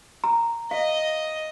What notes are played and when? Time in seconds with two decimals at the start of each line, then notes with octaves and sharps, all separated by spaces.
0.24 A#5
0.71 D#5 F5